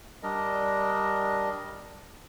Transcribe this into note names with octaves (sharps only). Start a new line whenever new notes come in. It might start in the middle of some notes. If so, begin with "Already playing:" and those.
G3 D4 A#4 D#5